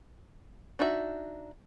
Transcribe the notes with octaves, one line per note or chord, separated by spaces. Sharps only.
D4 D#4 F#4 E5